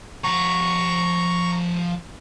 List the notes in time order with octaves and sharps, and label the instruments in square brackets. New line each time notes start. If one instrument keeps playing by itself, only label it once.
[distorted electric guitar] F3 F#5 [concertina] A#5 C#6